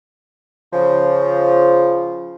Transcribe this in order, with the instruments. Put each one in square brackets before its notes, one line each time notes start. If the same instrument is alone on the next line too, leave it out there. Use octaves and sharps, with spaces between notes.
[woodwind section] C#3 F3